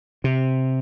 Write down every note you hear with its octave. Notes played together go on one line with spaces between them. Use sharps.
C3